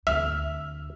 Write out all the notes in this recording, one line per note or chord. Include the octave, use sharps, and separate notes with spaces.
D2 D3 E5 E6 F6